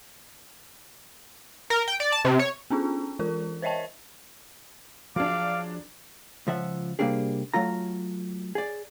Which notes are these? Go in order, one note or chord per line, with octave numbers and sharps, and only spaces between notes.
A#4
G5
D5
A5
C3
C#5
B3 C#4 D4 F4 G#4
E3 F4 A#4
C5 C#5 D#5 E5 G5 A5
F3 F#3 D4 G#4 F5 D6
C#2 F3 E5 F#5
C3 G3 A#3 D4 G4 G#4
F#3 A3 F4 A#5
G#4 D5